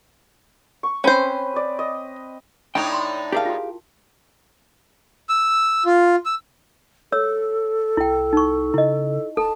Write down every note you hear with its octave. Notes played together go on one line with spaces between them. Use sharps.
C#6
C4 C#4 B4 C5
D5 D#6
D#5
A2 D4 D#4 C#5 G5 B5 D#6
B5 C6
E4 G4 G#4 A#4 F5 A5
F4 F#4
E6
F4
E6
A4 C#5 E6
C2 E4 G5
D#4 C#6
C#3 E4 D#5
D1 A4 A5